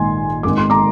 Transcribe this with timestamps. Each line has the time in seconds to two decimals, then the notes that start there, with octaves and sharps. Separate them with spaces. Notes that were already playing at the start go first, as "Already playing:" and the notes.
Already playing: A#1 G#2 D#3 G#5 C6
0.43 G#1 G#2 D#3 D6
0.58 C6
0.70 A#5 D6